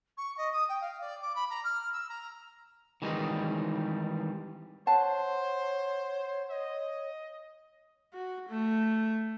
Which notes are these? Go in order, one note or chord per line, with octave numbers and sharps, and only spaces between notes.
C#6
D#5
D#6
G5
F5
D5
D6
B5
A#5
F6
E6
A#5
D#3 E3 G3 G#3 C4 D#4
C5 C#5 F#5 A5
D#5
F#4
A3